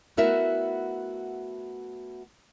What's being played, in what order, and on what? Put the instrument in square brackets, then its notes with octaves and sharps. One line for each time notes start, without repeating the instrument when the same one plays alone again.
[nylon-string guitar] A3 B3 E4 F#4 A#4 E5